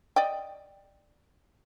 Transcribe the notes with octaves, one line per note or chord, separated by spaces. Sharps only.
D5 D#5 G5